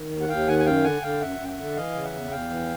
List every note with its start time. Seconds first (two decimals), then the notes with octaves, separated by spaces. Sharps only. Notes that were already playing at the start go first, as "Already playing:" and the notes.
Already playing: D#3
0.11 D#2
0.21 F#5
0.29 D#2 F5 G5
0.47 D#3 F#5 G#5
0.59 G#5
0.66 F#2 F5 G5
0.84 D3 F#5 G#5
1.02 D3 F5 G5
1.21 F#2 E5 F#5
1.39 F#2 G5
1.48 E5 F#5
1.58 D3
1.76 E3 D#5 F5
1.94 C#3
2.04 E5 F#5
2.13 E2
2.31 E2 F5 G5
2.49 E3